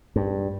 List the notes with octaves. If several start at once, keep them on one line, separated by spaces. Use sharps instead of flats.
G2